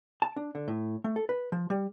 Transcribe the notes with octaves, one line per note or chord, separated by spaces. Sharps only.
A5
D4
D3
A2
A3
A4
B4
F3
G3